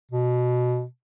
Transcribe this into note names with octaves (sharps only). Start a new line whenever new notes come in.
B2